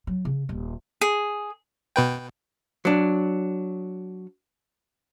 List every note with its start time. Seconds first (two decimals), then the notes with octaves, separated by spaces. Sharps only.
0.07 F#3
0.25 C#3
0.49 D#1
1.01 G#4
1.96 B2 B4 G5
2.85 F#3 D4